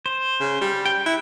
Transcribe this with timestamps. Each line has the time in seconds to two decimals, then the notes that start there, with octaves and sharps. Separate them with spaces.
0.06 C5
0.40 C#3
0.61 G3
0.86 G5
1.06 E4 F#6